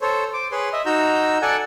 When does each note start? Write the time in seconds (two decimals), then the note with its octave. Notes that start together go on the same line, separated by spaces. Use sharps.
0.01 A4 C5 C#5
0.33 C5 D6
0.52 G#4 B4 C#5 C6
0.73 D#5 E5
0.86 D#4 F#4 A#5 E6 G6
1.42 A4 D5 F#5 G#5